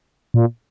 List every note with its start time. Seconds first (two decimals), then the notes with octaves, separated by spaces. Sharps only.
0.34 A#2